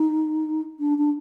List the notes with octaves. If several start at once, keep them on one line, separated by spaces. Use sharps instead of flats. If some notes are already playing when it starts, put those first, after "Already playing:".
Already playing: D#4
D4
D4